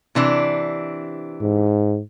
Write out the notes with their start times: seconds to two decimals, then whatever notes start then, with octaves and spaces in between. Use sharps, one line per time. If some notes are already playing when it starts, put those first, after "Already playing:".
0.15 C3 E3 D4
1.42 G#2